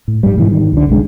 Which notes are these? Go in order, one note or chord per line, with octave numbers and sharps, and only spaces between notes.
A2
G#2 G3
G#2 B2 E3
D#3
C#2 D3
B1 G#3 D4